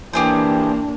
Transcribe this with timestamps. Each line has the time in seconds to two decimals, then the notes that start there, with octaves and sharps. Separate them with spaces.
0.13 E3 A#3 D4 G4 G#4 C5